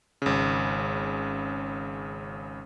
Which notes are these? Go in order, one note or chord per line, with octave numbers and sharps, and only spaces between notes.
G#1 C#3